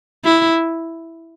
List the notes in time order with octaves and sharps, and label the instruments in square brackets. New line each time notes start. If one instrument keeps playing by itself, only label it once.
[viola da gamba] E4